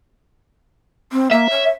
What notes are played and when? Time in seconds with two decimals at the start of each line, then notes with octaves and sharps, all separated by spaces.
1.12 C4
1.31 A#3 E5
1.50 C#5